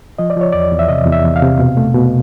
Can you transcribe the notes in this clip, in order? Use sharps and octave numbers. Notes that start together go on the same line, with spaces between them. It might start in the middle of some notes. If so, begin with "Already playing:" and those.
F3 D#5
D5
F3 C#5
E2 D5
E2
E5
C3 D#5
E2
E5
E2
F5
C3
B2
A3
B2